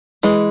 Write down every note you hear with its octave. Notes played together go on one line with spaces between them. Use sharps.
E3 G#3